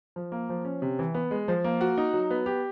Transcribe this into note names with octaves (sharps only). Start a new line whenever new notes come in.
F3
A#3
F3
C#4
C3
E3
B3
G#3
F3
A#3
F#4
D#4
F#3
B3
G4